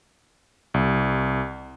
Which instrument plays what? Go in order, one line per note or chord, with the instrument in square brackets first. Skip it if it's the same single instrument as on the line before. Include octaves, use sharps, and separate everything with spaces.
[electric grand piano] C2